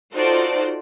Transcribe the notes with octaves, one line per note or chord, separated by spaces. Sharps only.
D#4 F4 F#4 A4 C5 D5